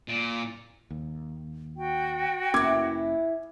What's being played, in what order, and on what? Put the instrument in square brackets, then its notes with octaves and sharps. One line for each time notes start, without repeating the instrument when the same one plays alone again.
[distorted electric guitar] A#2
[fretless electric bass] D#2
[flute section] F#4 G5
[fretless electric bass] F1 A#3 C#4 [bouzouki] E3 E4 [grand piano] D6 G#6